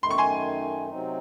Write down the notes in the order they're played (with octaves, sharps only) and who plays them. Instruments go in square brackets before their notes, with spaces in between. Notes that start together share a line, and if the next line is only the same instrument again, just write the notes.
[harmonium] F#2 D#3 A3 D#4 [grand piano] C6
[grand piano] C#6
G#5 C6
[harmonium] C3 F#3 C4 D#4